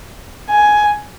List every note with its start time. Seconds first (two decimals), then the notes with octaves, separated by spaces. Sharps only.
0.49 G#5